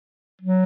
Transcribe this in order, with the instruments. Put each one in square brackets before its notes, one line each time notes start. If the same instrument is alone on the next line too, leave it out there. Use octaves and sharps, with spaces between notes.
[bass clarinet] F#3